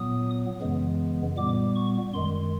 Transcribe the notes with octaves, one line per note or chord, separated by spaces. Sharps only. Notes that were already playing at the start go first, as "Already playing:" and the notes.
Already playing: A#2 F#3 B3 D#6
F#2 C#3 E3 G#3 B3
A#2 G3 B3 D6
C#6
F#2 D#3 G#3 C6